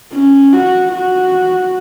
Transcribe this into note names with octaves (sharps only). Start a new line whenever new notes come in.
C#4
F#4
F#4